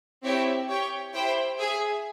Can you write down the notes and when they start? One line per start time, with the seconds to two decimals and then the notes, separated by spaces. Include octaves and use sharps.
0.24 C4 E4 G4 C#5 E5
0.69 G4 C#5 G5
1.13 E4 G4 C5 G5
1.58 G#4 E5 G#5